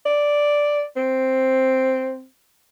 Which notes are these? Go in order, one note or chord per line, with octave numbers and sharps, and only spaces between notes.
D5
C4